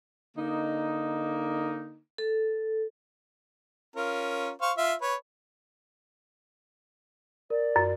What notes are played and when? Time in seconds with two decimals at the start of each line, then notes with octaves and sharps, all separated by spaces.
0.36 D3 A#3 D#4
2.18 A4
3.96 C#4 F4 A#4
4.61 C5 F5 C#6
4.78 F4 E5
5.01 B4 C#5
7.50 A#4 D5
7.76 F#2